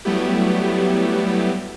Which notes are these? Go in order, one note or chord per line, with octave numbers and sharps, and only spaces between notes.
F#3 G3 A3 B3 E4 G4